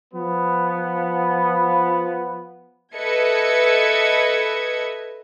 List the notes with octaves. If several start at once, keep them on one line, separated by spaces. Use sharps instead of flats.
F3 B3
A4 B4 D#5 E5 G#6 C#7